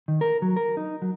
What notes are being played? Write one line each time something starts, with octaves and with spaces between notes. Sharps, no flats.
D#3
A#4
F#3
A#4
D#4
F#3